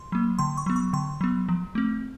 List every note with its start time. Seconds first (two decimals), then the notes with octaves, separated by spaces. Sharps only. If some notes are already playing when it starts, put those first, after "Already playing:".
Already playing: C6
0.12 F#3 A#3
0.39 D3 C6
0.57 C#6
0.66 F#3 B3
0.76 C#6
0.93 D3 C6
1.21 F#3 B3
1.49 F3
1.75 A3 C4